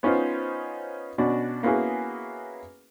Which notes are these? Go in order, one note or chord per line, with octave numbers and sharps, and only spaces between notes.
B3 C#4 D#4 F4 C5
B2 C#4 D4 F#4
A#3 B3 C#4 E4 F#4 G#4